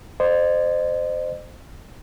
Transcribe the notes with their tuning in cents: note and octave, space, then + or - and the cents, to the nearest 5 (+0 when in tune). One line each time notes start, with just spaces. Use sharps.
C5 -10 D#5 -40